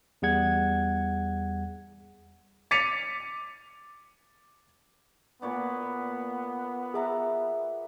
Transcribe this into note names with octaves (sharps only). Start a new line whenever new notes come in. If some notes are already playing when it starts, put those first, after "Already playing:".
E2 G3 G#4 F#5 G#6
D6 A6 B6 C#7 D#7 F7
A#2 B3 C#5 D5
G#4 D5 E5 F#5 A#5